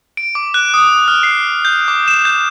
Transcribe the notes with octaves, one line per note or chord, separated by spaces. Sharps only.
D7
D6
F#6
D#6
F6
C7
G6
D6
E7
G6